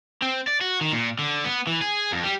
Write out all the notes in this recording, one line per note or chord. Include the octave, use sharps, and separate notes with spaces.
C4
D5
F#4
D#3
A#2
D3
B3
E3
G#4
F2
G3